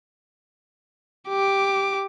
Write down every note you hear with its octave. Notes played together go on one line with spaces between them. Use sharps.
G4 D6